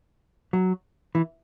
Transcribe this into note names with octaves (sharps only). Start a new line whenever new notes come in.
F#3
E3